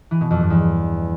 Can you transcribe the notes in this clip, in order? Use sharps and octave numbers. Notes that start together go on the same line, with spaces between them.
E3
B2
F2
G2
E2